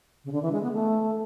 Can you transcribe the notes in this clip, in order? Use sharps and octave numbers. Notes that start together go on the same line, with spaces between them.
C#3
D3
E3
G#3
B3
A3